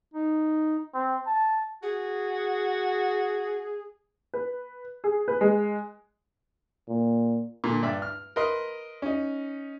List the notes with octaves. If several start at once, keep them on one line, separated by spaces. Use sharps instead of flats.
D#4
C4
A5
F#4 G#4
B4
G#4
B4
G#3
A#2
A#2 D3
G2 D5 E5 D6
F6
A#4 B4 D#5 C6
C#4 D#4